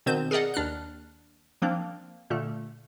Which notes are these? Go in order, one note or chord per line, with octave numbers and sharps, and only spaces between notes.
B2 D#3 C4 C5 G6
G#4 A#4 D5 D#5 F#5
D#2 D4 F6 F#6
F3 A#3 C4 D4
A#2 D3 A3